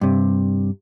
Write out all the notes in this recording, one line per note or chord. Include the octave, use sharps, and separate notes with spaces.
G2 C3